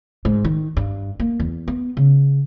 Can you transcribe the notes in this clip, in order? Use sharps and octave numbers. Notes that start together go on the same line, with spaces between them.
G#2
D#3
G2
A#3
E2
B3
C#3